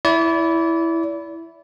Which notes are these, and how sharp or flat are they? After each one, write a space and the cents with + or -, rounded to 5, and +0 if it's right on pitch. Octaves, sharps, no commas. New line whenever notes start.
E4 +0 D5 -35